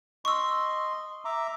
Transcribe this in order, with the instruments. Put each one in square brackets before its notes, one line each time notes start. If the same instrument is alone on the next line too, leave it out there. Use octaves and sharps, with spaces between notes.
[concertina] D#5 C6 [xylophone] C#6 E6
[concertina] E5 A#5 D6